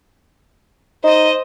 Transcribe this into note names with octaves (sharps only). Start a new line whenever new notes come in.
D#4 C5 D#5